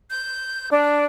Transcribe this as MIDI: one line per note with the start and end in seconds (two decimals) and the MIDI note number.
0.10 0.67 91
0.71 1.04 62